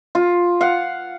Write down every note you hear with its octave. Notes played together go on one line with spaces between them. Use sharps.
F4
F5 F#5